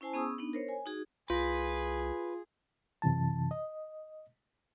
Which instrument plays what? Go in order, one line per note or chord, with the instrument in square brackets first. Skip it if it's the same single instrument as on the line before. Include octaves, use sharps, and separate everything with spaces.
[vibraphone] C#4 E4 C5 G#5 A5
B3 C#4 G#4 C#6 D#6 E6
B3 D4 D#4
A#4 C5 C#5
G#5
D#4 F#4 G#4
[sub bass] C2 [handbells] F4 [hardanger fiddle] G#4 [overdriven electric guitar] B4
[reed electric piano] F#2 C3 E3 A5
D#5